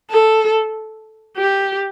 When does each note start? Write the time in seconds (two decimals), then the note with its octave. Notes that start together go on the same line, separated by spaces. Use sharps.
0.11 A4
1.37 G4